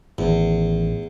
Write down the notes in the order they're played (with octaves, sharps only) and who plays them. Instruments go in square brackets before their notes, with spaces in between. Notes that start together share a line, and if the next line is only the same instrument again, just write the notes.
[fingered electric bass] A1 D#3 [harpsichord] E2